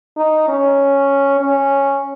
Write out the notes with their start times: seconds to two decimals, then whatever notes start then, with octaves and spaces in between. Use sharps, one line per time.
0.18 D#4
0.48 C#4
1.41 C#4